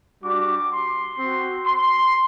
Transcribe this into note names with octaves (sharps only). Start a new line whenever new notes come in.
G3 D4 F#4 D6
C6
C4 F#4
C6